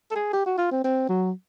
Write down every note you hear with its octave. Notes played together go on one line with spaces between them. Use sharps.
A4
G#4
G4
F#4
F4
C4
C4
F#3